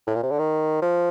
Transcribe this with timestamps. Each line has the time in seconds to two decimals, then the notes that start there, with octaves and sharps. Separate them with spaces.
0.07 A2
0.15 A#2
0.23 C3
0.31 D3
0.39 D#3
0.82 F3